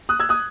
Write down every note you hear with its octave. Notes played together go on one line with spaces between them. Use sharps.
D#6 F#6
E6 G#6
D#6 F#6